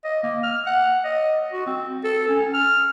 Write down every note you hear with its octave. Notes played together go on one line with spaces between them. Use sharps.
D#5
A#3
F6
F#5
D#5
F#4
C4
A4
C#4
F6